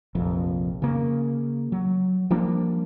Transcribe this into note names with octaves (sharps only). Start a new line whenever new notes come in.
F1 A#1 F2
C#3 A#3
F#3
F3 G3 A#3 D4